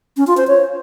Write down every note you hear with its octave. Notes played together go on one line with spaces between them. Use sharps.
C#4
F4
C5
C#5